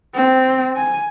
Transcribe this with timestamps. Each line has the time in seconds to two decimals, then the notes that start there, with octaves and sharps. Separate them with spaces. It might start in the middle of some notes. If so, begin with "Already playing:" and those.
0.15 C4
0.76 G#5